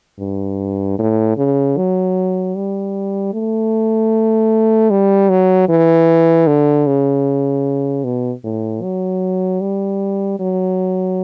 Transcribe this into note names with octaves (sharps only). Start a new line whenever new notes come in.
G2
A2
C#3
F#3
G3
A3
G3
F#3
E3
D3
C#3
B2
A2
F#3
G3
F#3